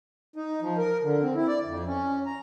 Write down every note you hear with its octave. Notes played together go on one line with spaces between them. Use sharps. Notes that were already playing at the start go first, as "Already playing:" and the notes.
D#4
F3
A#4
D3
C4
E4
D5
F2
C#4
A#5